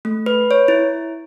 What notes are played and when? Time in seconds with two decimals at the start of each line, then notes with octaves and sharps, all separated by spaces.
0.05 A3
0.26 B4
0.51 C#5
0.68 E4